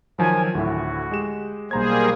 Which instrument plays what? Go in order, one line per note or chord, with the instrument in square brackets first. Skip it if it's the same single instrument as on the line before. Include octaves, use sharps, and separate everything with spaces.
[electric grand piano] D#3 F3 F#3 [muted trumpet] G#5
[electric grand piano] D2 A2 E4 [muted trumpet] F#4
[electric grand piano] G#3 G4 E7
[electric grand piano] B1 A#5 G#6 [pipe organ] G3 A#3 G#4 [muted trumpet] C5